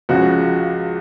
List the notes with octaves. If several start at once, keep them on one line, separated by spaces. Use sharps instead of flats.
C#2 C#3 F3 F#4